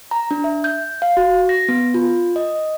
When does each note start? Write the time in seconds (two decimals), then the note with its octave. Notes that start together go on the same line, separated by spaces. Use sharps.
0.11 A#5
0.31 D4
0.44 E5
0.64 G6
1.02 F5
1.17 F#4
1.49 A#6
1.68 B3
1.94 F4
2.36 D#5